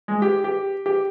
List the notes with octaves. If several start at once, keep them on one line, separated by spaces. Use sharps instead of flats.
G#3
G4
G4
G4